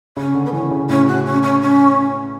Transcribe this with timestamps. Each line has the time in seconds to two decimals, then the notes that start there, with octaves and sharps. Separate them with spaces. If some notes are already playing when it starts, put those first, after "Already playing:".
0.17 C#3 C#4
0.35 D3
0.45 B3
0.53 E3 C#4
0.71 C#3
0.89 A2 C#4
1.08 F#4
1.25 C#4
1.42 C#4
1.61 C#4